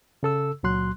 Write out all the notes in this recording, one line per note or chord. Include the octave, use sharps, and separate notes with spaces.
C#3 A4 E6
C#2 A#2 F#3 C6 F#6